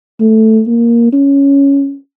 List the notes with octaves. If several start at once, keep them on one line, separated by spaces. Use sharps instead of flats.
A3
A#3
C#4